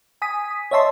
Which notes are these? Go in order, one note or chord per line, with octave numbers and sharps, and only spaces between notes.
G#5 D#6 B6
C#5 D#5 E5 A5 C6